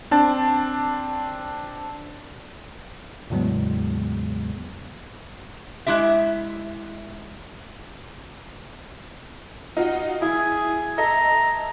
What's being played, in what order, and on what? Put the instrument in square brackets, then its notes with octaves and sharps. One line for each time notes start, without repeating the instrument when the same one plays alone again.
[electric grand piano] C4 D4 A5
[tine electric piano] E2 A2 C#3 F#3 G#3 B3
[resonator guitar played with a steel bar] G#3 E4 G4 E5
[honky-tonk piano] D#4 F4 F#4
[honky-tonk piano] E4 [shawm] G#4
[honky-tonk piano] A4 D#5 E5 [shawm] A#5